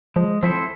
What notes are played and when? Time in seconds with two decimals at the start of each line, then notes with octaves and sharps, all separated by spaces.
0.16 F3 G#3
0.43 F3 C4 E4 A4 C5